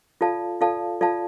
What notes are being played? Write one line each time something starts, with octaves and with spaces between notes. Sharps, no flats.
F4 A4 D5 F5 A5
F4 A4 D5 F5 A5
F4 A4 D5 F5 A5